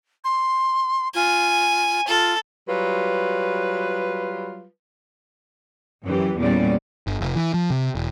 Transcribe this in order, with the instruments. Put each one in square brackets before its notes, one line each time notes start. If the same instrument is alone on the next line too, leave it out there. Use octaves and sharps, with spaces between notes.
[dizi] C6
[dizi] F4 [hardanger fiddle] G#5
[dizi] F4 [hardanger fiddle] A4
[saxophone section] F#3 G3 F4 B4
[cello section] F#2 E3 G4
E2 A#2 G3 C#4 D5
[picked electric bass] G1
F1
E3
F3
C3
E1